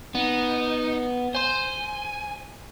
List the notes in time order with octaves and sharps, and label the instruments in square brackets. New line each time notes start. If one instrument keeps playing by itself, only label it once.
[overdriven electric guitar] B3 [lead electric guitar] D#4
[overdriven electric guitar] C5 C6 [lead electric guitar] G#5